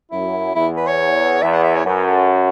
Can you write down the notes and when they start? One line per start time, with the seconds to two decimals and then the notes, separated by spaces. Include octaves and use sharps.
0.11 F#2 E4
0.55 E2 E4
0.77 B4
0.87 C#5
1.42 E2 E5
1.53 F#5
1.63 E5
1.75 C#5
1.85 F#2 B4
2.07 A4